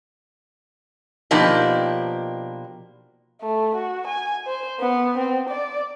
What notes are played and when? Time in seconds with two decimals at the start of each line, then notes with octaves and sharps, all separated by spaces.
1.31 B2 F3 A#3 D4 D#4 G4
3.42 A3
3.75 F#4
4.07 G#5
4.47 C5
4.80 B3
5.18 C4
5.49 D5